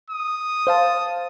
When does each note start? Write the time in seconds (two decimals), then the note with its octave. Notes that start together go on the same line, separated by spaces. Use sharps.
0.10 D#6
0.67 C5 F5 A5